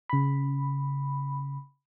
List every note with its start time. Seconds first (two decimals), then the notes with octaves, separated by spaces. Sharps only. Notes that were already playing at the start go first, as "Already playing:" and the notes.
0.10 C#3 B5